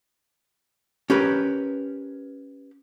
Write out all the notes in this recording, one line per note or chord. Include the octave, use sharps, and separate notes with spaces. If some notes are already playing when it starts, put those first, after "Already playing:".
C#4 G4 A#4 B4